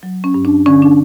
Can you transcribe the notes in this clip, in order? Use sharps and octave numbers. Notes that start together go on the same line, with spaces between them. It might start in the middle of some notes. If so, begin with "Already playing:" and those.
F#3
C#4
G2
D4
D3 C#4
D4